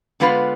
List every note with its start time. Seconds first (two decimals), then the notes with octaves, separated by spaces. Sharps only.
0.20 D3 G#3 B3 F4 B4